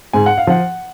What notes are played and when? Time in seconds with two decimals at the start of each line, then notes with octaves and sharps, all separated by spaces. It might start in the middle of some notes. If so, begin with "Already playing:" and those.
0.13 G#2 G#5
0.26 F#5
0.38 F5
0.47 F3 F#5